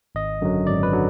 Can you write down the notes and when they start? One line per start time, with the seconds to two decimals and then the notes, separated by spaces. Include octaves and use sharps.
0.15 G#1 D#5
0.42 F#2 D3 F#3
0.66 G#1 D5
0.83 B4
0.93 D3 F#3